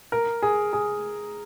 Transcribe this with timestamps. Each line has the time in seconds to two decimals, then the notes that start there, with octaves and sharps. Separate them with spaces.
0.12 A#4
0.42 G#4
0.73 G#4